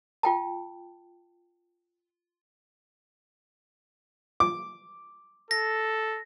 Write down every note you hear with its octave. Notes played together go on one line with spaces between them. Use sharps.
F4 G5 A5
D6
A4 A#6